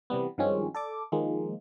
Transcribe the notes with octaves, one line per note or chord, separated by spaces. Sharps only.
C3 E3 G3 B3
G2 D#3 F3 G#3 C4 C#4
A4 D5 D6
D#3 F3 G#3 A#3